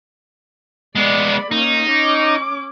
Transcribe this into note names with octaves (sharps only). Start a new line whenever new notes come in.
G#3 B3 D5 B5
A#3 C#4 D#4
C#4 D6